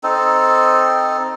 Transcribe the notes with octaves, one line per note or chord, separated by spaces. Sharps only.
C4 D#4 A4